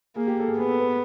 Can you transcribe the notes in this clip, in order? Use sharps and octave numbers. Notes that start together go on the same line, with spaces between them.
A#3 G#4
G4
A4
G#4
B3 G#4
A4
B4